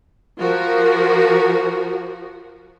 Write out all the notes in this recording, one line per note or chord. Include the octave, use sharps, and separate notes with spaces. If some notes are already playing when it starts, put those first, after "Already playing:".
F3 F#4 A#4